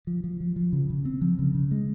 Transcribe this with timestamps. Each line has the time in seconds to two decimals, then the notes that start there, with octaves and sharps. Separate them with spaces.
0.07 F3
0.24 F3
0.41 F3
0.56 F3
0.73 C#3
0.90 C#3
1.05 C4
1.22 F3
1.39 C#3
1.55 C#3
1.71 G#3